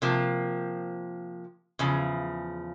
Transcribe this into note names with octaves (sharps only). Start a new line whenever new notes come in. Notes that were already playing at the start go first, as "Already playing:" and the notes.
C3 F3 A#3
E2 C#3 F3